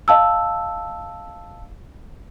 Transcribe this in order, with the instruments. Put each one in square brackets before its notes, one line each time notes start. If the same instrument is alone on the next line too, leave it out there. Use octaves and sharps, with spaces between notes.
[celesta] D#5 F5 A5 E6